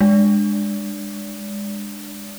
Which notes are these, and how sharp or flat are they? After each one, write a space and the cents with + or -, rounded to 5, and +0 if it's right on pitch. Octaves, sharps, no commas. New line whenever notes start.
G#3 -15 D4 +20 D5 -35